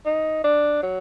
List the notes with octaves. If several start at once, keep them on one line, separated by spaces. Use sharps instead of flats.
D#4
D4
F#3